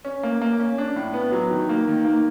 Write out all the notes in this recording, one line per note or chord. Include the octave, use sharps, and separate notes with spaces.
C#4
A#3
A#3
C#4
D4
A2
B3
F#3
D#3
A#3
D#3
A#3